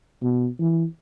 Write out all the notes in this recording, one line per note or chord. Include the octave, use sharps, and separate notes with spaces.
B2
E3